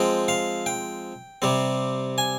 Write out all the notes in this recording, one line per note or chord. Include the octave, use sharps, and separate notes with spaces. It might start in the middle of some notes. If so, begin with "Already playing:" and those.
Already playing: F3 G#3 C4 G5
F5
G5
C3 G3 C4
G#5